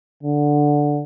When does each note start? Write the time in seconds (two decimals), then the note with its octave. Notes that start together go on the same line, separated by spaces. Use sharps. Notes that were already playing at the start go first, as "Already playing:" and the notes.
0.23 D3